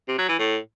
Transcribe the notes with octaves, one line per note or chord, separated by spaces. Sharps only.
C3
F#3
E3
A2